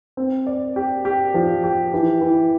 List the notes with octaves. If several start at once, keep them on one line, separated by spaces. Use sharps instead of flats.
C4
D5
G4
G4
F3
G4
E3
E3